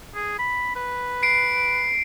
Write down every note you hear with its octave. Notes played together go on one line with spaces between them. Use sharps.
G#4
B5
B4
C7 D7